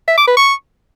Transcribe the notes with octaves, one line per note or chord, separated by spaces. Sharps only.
E5
D6
B4
C#6